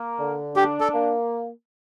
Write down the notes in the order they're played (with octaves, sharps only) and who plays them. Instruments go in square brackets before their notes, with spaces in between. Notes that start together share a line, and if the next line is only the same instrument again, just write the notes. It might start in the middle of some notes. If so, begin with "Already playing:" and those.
Already playing: [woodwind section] A#3
D3
[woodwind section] D4 [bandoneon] G4
[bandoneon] A4
[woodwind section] A#3